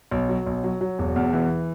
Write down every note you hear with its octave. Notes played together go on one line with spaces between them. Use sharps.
B1
F#3
B1
F#3
F#3
E1
E2
E3